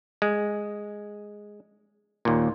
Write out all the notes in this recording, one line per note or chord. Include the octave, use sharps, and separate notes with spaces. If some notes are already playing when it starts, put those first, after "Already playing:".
G#3
D#2 A#2